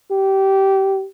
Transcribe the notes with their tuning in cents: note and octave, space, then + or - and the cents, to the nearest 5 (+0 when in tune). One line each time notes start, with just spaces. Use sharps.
G4 -20